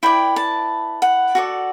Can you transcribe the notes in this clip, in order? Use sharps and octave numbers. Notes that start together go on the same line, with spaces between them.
E4 B4 D5 G5
A5
F#5
F#4 A4 D5